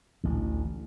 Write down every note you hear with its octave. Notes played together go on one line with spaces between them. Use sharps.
A1 D2